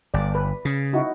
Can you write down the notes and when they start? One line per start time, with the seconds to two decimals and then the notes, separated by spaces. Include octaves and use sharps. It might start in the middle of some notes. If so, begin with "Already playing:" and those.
0.14 G1 D5
0.35 B4
0.65 C#3
0.93 D#4 E4 F#4